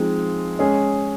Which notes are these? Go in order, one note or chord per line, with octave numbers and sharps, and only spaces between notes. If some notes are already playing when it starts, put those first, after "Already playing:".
Already playing: F3 G#3 C4 D#4
G#3 C#4 G#4